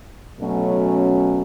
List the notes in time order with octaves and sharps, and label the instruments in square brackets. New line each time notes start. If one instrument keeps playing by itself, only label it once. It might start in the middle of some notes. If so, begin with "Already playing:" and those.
[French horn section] B2 F#3 A3 C#4